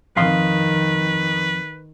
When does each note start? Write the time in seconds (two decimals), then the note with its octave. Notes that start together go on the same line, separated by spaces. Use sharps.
0.17 F2 D#3 B4 F5 C6